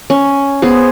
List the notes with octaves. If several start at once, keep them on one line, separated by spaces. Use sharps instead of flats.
C#4
B3 G#4 C5